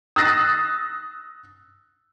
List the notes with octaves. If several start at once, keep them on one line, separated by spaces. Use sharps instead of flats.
D#6 E6 F#6 A6 A#6 C7